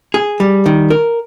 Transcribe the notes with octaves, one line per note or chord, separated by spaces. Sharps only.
G#4
G3
D#3
A#4